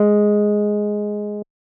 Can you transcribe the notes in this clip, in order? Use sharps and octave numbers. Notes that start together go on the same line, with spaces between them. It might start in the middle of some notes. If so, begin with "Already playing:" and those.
Already playing: G#3